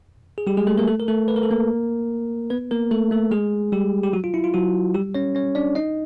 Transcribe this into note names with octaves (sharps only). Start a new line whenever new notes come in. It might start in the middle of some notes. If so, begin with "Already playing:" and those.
G#4
G3 G4
G#3 G#4
A3 A4
A#3 A#4
A3 A4
A#4
A3 A4
B4
A#4
A4
A#3 A#4
B3 B4
A#3 A#4
A3 A4
A3 A4
G#3 G#4
G3 G4
G4
F#3 F#4
F4
E4
F4
F#3 F#4
G3 G4
C#4 C#5
C#4 C#5
D4 D5
D#4 D#5